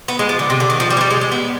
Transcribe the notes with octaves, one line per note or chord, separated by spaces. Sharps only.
B3
G#3
F3
D3
C3
D3
D#3
F3
G3
G#3
G3
G#3
G#3
B3